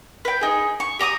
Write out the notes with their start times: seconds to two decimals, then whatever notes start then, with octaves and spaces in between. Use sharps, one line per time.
0.25 B4 G5
0.41 D#4 G#4
0.80 C#6
0.99 G4 A#5 D6 D#6